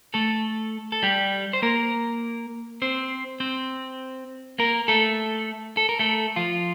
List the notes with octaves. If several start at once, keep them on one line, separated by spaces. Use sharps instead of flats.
A3 A4
A4
G3 G4
C5
A#3 A#4
C4 C5
C4 C5
A#3 A#4
A3 A4
A4
A#4
A3 A4
F3 F4